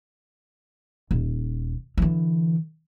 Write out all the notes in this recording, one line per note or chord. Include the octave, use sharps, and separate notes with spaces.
D#1
D3 E3